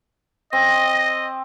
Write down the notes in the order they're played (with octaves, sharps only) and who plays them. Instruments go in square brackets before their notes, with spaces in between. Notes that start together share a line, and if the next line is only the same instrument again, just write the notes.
[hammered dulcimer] C4 [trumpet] D#5 [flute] A#6